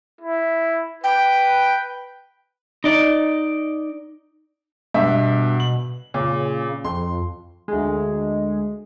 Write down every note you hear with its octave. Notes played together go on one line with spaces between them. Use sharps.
E4
B4 G5
D#4 D5 D#5
G2 B2 E5
F#7
A#2 C#3
F2 C6
D2 G#3